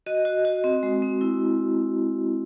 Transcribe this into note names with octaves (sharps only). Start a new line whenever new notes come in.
F#4 D#5
F#4
F#4
C4
G#3
C4
E4